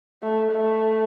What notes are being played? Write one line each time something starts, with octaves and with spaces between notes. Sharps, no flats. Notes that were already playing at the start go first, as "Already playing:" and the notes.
A3
A3